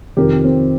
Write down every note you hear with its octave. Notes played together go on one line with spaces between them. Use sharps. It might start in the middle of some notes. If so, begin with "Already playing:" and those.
F2 C3 D#3 G4 A#4
C4